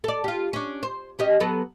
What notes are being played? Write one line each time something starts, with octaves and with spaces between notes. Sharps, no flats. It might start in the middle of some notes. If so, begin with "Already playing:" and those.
A4 D5
F4 G4
C#4 D4
C5
C#4 G4 D#5
F#3 B3 A4